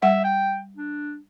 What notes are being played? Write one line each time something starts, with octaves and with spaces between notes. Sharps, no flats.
G3 E5 F#5
G5
D4